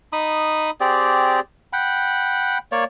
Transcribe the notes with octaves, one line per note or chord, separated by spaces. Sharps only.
D#4 B5 D#6
C4 G4 G#4 D5
F#5 G5 B5
A#3 C#5 D5